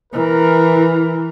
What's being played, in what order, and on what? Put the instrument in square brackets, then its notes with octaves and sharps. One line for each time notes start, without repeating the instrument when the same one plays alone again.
[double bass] E3 [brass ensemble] A#4